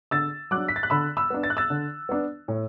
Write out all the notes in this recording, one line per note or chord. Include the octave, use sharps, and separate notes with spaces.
D3 E6 A6
F#3 D4 D6 F#6
B6
A6
F#6
D3 B5 E6
B5 E6
B3 D4
A6
F#6
E6 A6
D3
B3 D4
A2